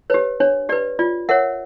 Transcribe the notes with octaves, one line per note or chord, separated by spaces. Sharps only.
G4 B4 C#5
D4 C#5
G4 B4 D5
F4 D5
A#4 C#5 E5 F#5